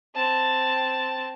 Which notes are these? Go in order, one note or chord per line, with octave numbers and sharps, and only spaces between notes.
C4 A5